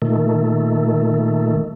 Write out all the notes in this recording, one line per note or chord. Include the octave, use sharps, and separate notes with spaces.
A#2 D#3 A3